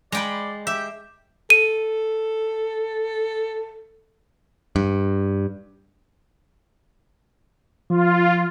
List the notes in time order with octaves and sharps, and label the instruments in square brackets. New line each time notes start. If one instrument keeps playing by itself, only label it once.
[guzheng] G#3 G5 B5 [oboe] D5
[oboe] G4 [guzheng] E5
[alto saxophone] A4 [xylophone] D#7
[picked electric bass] G2
[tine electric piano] F3 [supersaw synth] F4